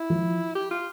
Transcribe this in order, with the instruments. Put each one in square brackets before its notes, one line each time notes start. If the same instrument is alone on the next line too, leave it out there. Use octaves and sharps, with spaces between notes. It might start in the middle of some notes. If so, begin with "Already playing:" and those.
Already playing: [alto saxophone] E4
[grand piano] F3
[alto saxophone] G4
F4